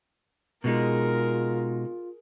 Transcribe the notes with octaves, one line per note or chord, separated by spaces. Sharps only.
B2 G#3 D#4 F4 G#4 A#4